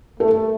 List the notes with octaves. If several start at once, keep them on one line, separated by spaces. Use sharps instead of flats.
A3 A4